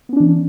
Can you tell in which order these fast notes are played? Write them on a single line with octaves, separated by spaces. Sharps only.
B3 C#4 D4 E3